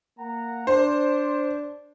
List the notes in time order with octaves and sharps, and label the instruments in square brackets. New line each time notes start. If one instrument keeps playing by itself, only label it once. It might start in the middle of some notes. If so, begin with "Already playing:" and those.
[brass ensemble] A#3 F#5 A#5
[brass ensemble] D4 [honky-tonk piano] C5